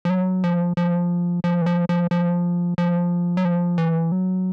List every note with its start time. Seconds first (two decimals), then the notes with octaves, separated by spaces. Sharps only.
0.05 F3
0.10 F#3
0.44 F3
0.77 F3
1.44 F3
1.61 E3
1.66 F3
1.89 F3
2.11 F3
2.78 F3
3.37 F#3
3.45 F3
3.78 E3
4.12 F#3